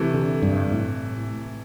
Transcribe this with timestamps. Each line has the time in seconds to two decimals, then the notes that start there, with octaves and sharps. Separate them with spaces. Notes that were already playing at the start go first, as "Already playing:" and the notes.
Already playing: C3 E3 A3
0.14 D3
0.42 G2
0.72 A2